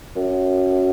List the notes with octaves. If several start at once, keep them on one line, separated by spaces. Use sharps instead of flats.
F#2